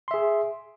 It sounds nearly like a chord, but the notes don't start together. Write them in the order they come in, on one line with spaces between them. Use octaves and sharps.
C6 E5 G#4